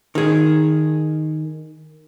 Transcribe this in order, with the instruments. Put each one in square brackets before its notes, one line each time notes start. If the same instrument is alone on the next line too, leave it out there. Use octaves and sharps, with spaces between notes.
[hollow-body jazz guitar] D#3 G#4